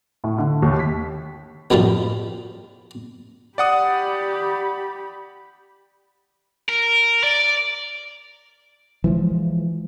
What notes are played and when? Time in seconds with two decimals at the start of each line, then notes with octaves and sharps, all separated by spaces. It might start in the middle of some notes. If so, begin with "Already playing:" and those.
0.24 A2
0.38 D3
0.62 D#2
0.79 B6
1.71 C2 F#2 A2 F3 G3
3.58 G4 D5 F#5 B5 D#6
6.69 A#4
7.24 D5
9.04 E3 F3 G#3